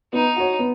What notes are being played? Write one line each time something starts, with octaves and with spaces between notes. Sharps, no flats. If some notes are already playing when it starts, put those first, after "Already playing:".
B3 D#4
F#4 C#5
B3